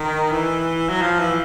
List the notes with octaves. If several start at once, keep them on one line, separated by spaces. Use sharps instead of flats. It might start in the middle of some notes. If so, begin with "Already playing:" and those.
Already playing: D#3
E3
F#3
F3
E3